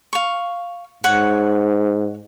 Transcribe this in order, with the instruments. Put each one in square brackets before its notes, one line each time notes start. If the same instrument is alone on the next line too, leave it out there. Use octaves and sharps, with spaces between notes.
[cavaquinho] F5 C#6
[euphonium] G#2 [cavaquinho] C#5 F#5